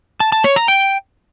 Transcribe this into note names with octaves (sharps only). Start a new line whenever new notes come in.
A5
A5
C#5
A#5
G5